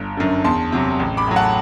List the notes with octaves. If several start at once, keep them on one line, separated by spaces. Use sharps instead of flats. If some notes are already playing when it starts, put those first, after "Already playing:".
Already playing: G1
F#2 D3
E2 A5 C6
C3 F#3
A1
B5 D6
A2 F#3
F#5 A5